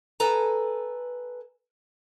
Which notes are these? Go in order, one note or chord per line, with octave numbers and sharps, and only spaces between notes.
A4 B4 G#5 A#5